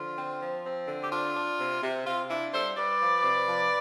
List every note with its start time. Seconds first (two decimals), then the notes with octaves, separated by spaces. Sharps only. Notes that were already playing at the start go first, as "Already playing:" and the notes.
Already playing: D3 F3 F4
0.17 C4
0.41 F3
0.65 C4
0.87 D3
1.02 G4
1.11 D4 F4
1.35 D4
1.59 C3
1.82 C3
2.05 C3 F4
2.29 D4 E4
2.53 G3 A4 C5
2.76 G3 B4 D5
3.00 F3
3.24 C3
3.48 F3